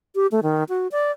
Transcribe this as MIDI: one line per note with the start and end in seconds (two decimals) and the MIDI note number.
0.15 0.27 67
0.32 0.40 57
0.43 0.64 51
0.69 0.88 66
0.92 1.11 74